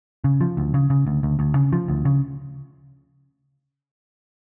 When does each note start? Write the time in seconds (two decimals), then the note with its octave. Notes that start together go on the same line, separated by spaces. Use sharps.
0.24 C#3
0.41 F3
0.57 D2
0.74 C#3
0.90 C#3
1.06 D2
1.23 D2
1.39 D2
1.55 C#3
1.73 F3
1.88 D2
2.05 C#3